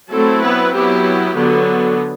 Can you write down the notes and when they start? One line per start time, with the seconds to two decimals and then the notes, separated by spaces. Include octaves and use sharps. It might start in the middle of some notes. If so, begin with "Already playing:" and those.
0.11 F#3 A3 C4 E4 A4
0.43 B3 B4
0.73 F#3 B3 E4 G4
1.35 D3 F#3 B3